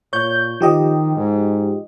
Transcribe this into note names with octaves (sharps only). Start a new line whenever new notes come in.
A#2 C#5 G6
D#3 F3 G4 D#5
G#2